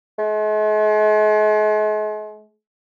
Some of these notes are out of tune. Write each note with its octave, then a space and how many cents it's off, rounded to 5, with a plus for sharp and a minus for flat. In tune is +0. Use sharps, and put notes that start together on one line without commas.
G#3 +45